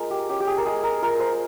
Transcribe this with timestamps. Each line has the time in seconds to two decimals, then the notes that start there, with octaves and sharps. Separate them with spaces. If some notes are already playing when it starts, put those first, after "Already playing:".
Already playing: G#3 F4 A#4
0.11 G4
0.29 C#4 G4
0.40 G4
0.47 G#4
0.57 A#4
0.65 G#3 G#4
0.83 A#4
1.02 F4 A#4
1.20 C5